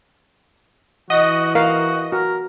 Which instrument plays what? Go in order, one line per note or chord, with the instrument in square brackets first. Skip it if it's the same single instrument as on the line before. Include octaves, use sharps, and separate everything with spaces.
[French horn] E3 [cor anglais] F#4 [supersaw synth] D#5 [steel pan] F#5
[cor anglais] F#4 [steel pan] A#4 F5
[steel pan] F#4 [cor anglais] A#4